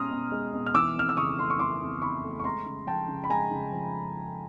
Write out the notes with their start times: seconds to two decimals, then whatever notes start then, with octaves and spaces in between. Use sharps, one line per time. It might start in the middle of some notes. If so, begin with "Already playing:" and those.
Already playing: B2 G#3 C#4 A#5 C6 D#6 F6
0.11 B2
0.32 G#3
0.54 B2
0.66 F6
0.74 E3 D6 E6
0.95 F2 F6
1.09 E6
1.17 C#3 C#6 D#6
1.39 A3 C6
1.50 C#6
1.59 E3 C6 D6
1.81 F2
2.02 C#3 B5 C#6
2.24 A3
2.40 C#6
2.44 G#3 A#5 C6
2.66 C#3
2.87 F3 G5 A5
3.08 C#3
3.24 B5
3.30 G#3 G#5 A#5
3.51 C#3
3.72 F3